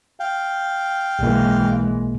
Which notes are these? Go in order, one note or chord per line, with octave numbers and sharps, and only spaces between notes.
F5 G5
B1 B2 E3 G#3 A#3